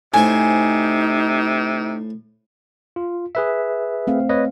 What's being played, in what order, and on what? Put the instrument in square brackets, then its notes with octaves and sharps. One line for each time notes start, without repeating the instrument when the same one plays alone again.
[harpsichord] A2 C5 [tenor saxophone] C3 [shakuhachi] D#4 [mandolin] G#5
[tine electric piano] F4
G#4 B4 E5
[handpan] A3 C4 F5
[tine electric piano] B4 C#5 D#5